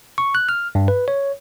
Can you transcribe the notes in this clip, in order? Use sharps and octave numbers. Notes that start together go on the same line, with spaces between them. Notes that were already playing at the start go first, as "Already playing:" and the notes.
C#6
F#6
F6
G2
B4
C#5